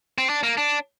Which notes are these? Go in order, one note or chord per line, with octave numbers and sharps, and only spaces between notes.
C4
D4
A#3
D4